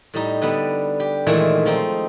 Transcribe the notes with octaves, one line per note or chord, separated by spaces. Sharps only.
A2 G3 D#4
D3 G3 B3
G4
A#2 D#3 E3 G#3 A3
F3 C4 D#4